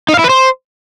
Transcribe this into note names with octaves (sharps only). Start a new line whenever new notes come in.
D#4
F5
E4
B4
C5